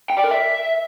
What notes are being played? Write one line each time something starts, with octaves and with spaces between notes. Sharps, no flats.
G5
D5
A#4
E5